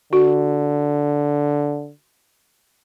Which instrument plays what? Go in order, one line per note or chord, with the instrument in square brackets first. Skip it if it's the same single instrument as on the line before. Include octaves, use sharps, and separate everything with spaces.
[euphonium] D3 [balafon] F#4